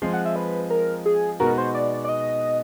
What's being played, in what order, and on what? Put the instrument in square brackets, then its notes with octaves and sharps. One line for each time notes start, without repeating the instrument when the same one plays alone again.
[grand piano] F3 G#3 C4 [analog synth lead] C6
[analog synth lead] F#5
E5
B4
A#4
G#4
[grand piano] B2 G#3 B3 D#4 F#4 [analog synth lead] A#4
[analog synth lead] C5
D5
D5
D#5